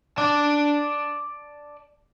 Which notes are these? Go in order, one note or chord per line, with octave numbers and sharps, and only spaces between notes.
D5 A5